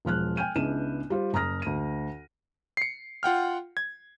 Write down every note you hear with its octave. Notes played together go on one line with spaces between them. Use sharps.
E1 F3 F6 F#6
G5 G#5 F6 G6 D#7
C#2 B3 D4 E4 D#7 E7
G3 F4 C5
F#1 A#5 D#6 F6 A#6
D2 D#7
C7 C#7
F4 F#5 G5 F6
G#6